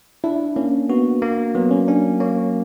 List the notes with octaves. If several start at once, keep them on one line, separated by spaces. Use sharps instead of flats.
D4 E4
A#3 C#4
B3 F#4
A#3
F#3 B3
C#4
C#4 D4
A#3 C#5